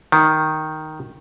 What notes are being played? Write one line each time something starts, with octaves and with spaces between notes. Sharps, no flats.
D#3